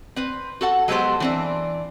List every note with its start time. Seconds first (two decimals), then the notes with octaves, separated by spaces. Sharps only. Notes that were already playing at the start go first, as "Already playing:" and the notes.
0.16 C4 B4
0.61 F#4 A4 F#5
0.88 F#3 G#3 B3 G4 A4 C5
1.20 E3 C4 D4